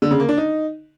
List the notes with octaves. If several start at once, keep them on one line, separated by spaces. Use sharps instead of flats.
D3
C#3
A#3
D4
D#4